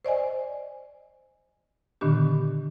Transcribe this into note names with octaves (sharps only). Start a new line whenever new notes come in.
C5 D5 D#5 G#5
A#2 D3 D#3 B3 D4 G4